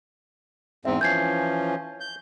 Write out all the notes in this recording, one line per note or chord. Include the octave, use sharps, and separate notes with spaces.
E2 G#2 C4 E5
E3 F3 C#4 G6 G#6 C7
G6